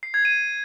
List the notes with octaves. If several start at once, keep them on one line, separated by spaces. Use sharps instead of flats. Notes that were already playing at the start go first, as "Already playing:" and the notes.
C7
G#6
D#7